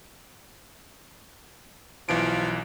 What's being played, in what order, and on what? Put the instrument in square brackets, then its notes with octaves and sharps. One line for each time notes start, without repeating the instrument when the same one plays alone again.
[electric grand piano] B1 E3 D7 [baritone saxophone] F3